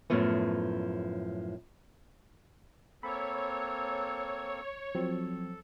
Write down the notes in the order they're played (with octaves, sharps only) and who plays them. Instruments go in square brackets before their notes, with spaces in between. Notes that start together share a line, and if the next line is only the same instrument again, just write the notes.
[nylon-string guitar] F#2 A2 F3 A3 B3
[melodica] A#3 C4 A4 [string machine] C#5 [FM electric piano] B5
[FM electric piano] F3 F#3 C4 [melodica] A4